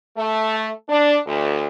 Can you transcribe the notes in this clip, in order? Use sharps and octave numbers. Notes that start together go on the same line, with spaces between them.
A3
D4
D2